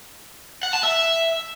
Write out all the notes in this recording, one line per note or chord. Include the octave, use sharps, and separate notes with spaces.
F#5
A5
E5